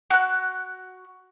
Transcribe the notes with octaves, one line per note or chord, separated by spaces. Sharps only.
F#4 F#6